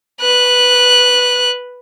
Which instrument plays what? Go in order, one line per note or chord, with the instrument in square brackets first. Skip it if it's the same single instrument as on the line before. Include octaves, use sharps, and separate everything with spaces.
[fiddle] B4 F#6